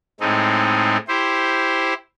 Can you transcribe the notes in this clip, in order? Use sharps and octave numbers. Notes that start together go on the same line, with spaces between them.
A2 G#3 A3 C4 D#4
E4 G4 C5